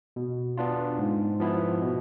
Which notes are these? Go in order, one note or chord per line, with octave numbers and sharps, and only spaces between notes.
B2
B3 D4 F4
G#2
F3 B3 E4
B2